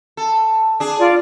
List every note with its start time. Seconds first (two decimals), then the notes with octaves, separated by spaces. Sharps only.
0.17 A4
0.80 D4 G#4
0.99 F4 D5